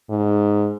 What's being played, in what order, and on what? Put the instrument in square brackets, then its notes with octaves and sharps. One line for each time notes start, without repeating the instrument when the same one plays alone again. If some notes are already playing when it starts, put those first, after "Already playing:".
[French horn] G#2